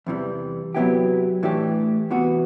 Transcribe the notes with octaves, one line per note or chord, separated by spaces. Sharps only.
E2 C3 E3 G3
C3 F#3 B3 E4 G4
A2 E3 A3 D4 G4
C2 C3 E3 B3 F#4